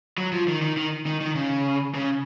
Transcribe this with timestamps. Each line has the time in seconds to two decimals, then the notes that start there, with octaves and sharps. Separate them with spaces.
0.18 F#3
0.32 F3
0.47 D#3
0.62 D#3
0.77 D#3
1.06 D#3
1.21 D#3
1.35 C#3
1.95 C#3